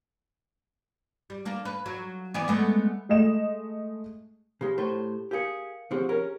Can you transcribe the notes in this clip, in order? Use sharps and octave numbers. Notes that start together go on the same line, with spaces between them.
G3
A#3 D4
B4
F#3
E3 B3 D5
G#3 A3 B3
G#3 A3 D#5 E7
C#3 G#3 G4
A2 A3 C5
G4 G#4 A#4 F5 C#7
D3 F3 C4 G4 G#4
C#4 A#4